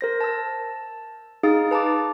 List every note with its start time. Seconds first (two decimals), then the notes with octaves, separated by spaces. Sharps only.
0.01 A#4 C5 A#6
0.21 A5 E6
1.43 D#4 G#4 F5 D#6
1.71 B4 A5 A#5 D6